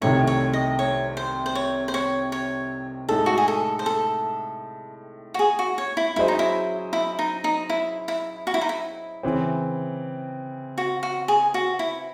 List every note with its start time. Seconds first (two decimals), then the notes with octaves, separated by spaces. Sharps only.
0.01 C2 C3 D#3 A3 C#5
0.27 C#5
0.53 D#5
0.79 C#5
1.17 C5
1.46 C5
1.55 C#5
1.88 C5
1.94 C#5
2.32 C#5
3.09 A2 G#3 D#4 A4
3.26 F#4
3.38 G#4
3.48 A4
3.79 C5
3.86 A4
5.34 F#4
5.39 G#4
5.59 F#4
5.78 C#5
5.97 E4
6.16 F#3 C#4 E4 G#4 C5 D#5
6.28 D#4
6.39 E4
6.93 E4
7.19 D#4
7.44 D#4
7.70 E4
8.08 E4
8.47 F#4
8.54 E4
8.61 D#4
8.69 E4
9.23 C#3 E3 C4
10.78 F#4
11.03 F#4
11.28 G#4
11.54 F#4
11.79 E4